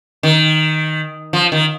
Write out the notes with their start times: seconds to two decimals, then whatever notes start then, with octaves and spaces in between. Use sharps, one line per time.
0.23 D#3
1.33 F3
1.52 D#3